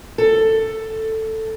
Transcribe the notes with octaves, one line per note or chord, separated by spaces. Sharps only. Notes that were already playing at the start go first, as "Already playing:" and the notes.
A4